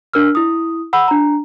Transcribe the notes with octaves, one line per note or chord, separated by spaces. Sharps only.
D4 A#4 E6 F6
E4 D#6
F#5 B5 E6
D4 A#5